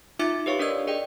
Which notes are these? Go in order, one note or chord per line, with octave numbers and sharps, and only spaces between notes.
D#4 F4 E5 D6 A6 C#7
G4 B4 C#5 F5 C#6
D4 A#4 D5 D#5 E6 G#6
G#4 D5 D#5 G5